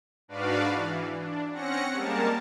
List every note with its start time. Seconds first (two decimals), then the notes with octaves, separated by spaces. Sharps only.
0.28 G#2 D4 F#4 B4 D5 F5
0.74 E3
1.18 D4
1.51 C4 C#4 F#5 A#6 C#7
1.93 G3 G#3 A#3 A#4 A5